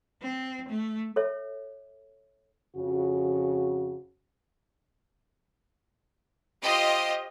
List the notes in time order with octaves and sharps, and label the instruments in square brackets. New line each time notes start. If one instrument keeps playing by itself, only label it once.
[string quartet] C4
A3
[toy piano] A4 C#5 E5
[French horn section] F2 C#3 F#4
[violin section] F4 G4 C5 D#5